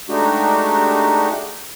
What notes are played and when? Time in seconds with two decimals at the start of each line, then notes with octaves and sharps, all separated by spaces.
0.09 G#3 A3 D4 D#4 F#4 G4